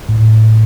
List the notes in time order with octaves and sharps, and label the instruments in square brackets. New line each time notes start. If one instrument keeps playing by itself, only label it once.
[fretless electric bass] A2